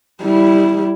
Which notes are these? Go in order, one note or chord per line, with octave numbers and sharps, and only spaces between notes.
G3 E4